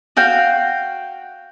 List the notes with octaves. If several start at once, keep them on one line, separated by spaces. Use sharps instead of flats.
F#4 F5 G5